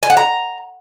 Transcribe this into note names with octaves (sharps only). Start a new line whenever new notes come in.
G#5
F#5
A#5